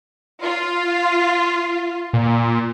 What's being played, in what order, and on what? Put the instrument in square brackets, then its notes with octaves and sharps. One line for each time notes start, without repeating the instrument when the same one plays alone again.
[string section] F4
[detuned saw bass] A#2